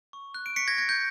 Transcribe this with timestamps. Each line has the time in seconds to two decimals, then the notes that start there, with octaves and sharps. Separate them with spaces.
0.13 C#6
0.34 F#6
0.46 D7
0.56 C#6 B6 C#7
0.68 G#6 A#6
0.78 F#6 G#6
0.89 G6